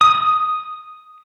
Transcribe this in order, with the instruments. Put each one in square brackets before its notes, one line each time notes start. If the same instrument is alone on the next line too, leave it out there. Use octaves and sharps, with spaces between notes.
[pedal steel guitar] D#6